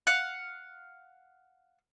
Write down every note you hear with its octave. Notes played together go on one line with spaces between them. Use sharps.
F5 F#5